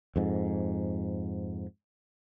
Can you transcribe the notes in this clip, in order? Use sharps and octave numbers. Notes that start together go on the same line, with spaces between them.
F2 G#2